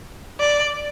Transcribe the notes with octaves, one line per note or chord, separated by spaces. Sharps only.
D5